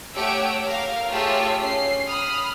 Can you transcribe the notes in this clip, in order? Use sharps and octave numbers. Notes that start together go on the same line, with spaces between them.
A3 G4 C#5 F#5 E6 D7
A#4 F5
A3 F4 G4 G#4 C#5 E6
C#4 C7
B5 D#6 F6